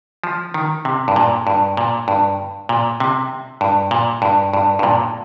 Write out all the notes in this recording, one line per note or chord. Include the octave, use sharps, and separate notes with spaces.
F3
D#3
C3
G2
A#2
G2
A#2
G2
A#2
C3
G2
A#2
G2
G2
G2
A#2